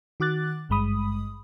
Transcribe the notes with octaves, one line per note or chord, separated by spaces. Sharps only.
D#3 F#4 D6 F#6 A6
G#1 G2 G#3 B5 D#6